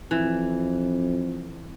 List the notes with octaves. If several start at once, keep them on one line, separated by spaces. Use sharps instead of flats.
F2 E3